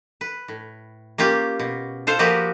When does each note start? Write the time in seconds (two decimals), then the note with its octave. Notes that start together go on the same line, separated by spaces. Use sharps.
0.21 B4
0.48 A2
1.18 A#3 C#4 F4 G4
1.59 B2
2.07 F4 A4 C5 F5
2.19 F3 A#3 F#4 G4 A#4 B4